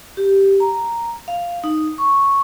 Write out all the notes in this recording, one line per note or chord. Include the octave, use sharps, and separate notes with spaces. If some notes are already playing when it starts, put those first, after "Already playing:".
G4
A#5
F5
D#4
C#6